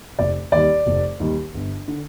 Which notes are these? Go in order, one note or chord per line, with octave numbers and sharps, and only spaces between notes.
F1 D5
D#2 D#3 G3 D5
F1
D#2 D#3 G3
G1
D3